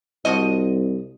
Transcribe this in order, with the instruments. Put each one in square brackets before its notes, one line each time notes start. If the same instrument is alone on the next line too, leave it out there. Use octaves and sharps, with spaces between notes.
[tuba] C2 [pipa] F3 F#4 D#5